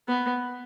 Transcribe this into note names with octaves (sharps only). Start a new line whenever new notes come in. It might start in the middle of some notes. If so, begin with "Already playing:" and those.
B3